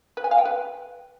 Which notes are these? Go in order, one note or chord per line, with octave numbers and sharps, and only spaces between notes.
B4
G#5
F5
G5
B4